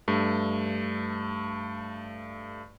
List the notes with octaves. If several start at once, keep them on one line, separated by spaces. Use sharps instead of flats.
G2 A3